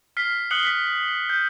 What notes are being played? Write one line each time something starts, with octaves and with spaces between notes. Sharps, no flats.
F6 B6 C7
D#6 F#6 C7 C#7 F#7 G7
B6
G6